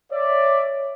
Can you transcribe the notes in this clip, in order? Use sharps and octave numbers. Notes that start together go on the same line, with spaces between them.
C#5 D5 E5